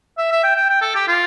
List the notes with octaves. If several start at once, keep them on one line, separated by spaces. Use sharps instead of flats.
E5
E5
G5
G5
G5
A4
G4
F4